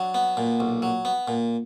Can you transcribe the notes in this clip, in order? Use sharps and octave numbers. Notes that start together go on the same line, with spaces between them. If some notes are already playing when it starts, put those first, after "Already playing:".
Already playing: F#3 D4
B3
A#2
B1
F#3
B3
A#2